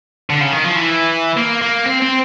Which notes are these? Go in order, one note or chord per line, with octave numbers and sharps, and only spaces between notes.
D3
C#3
D#3
F3
E3
A#3
A#3
C4
C4